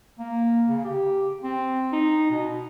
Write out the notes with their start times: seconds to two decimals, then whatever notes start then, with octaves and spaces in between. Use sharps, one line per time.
0.19 A#3
0.68 C#3
0.85 G4
1.44 C4
1.93 D#4
2.31 B2